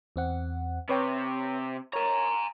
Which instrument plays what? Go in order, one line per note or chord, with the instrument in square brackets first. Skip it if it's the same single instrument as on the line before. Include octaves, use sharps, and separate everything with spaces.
[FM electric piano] E2 C4 F#5
[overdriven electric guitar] C3 [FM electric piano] B4 C#5 G5
[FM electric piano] A#4 C#5 [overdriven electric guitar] G#5 A#5